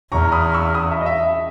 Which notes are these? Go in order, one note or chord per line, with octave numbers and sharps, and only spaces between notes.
E2 A#5 C#6
B5 D#6
C#6 E6
B5 D#6
E5
D#5
E5
E5